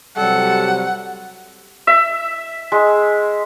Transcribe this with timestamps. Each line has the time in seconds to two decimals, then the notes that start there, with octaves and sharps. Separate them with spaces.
0.17 C3 F#3 G3 A4 F#5
1.87 E5
2.72 G#3